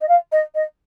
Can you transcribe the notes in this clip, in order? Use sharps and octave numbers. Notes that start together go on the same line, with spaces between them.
D#5
F5
D#5
D#5